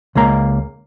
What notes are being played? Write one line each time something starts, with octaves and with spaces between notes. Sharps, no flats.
C#2 G#3 A#3 A#5